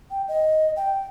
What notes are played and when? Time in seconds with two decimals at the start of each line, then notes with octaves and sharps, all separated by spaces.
0.11 G5
0.28 D#5
0.76 G5